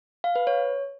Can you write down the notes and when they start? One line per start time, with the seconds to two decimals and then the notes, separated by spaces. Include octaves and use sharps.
0.24 F5
0.36 B4
0.47 C#5